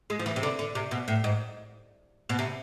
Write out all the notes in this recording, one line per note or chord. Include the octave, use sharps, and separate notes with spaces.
G#3
F3
E3
C3
D3
D3
C3
B2
A2
G#2
B2
C3